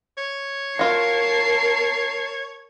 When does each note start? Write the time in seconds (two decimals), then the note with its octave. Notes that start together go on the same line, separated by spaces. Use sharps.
0.18 C#5
0.79 F4 F#4 A#4 A5 C7